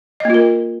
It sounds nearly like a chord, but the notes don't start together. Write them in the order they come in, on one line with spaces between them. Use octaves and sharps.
D#5 A#3 F4 A#4